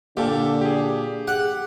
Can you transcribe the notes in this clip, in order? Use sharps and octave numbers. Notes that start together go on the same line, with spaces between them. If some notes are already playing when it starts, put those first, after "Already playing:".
A#2 D3 G4 A4 A5
G4 G#4
G4 G#4 F#5